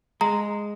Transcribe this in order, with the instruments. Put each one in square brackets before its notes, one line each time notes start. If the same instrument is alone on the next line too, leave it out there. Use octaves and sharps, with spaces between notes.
[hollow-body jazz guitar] G#3 [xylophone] A#5